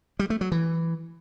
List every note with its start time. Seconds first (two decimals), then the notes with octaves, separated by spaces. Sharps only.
0.19 G3
0.30 A3
0.41 F#3
0.52 E3